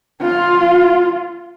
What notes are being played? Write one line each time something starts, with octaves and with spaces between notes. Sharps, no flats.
F4